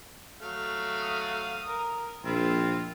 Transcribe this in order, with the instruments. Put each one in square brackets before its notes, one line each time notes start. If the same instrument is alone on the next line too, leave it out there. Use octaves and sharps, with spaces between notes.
[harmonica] F#3 A3 F5
[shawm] D#6
[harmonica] A#4
[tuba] A#1 [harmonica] C4 E4 [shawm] F4